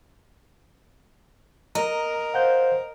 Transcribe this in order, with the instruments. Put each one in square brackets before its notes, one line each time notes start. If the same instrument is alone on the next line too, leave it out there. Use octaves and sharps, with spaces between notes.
[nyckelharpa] A#4 [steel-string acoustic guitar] D#5 [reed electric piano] A#5
[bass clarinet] C5 [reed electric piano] F5 F#5 G6